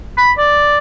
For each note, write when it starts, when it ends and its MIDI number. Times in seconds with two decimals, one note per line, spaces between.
0.18 0.31 83
0.38 0.78 74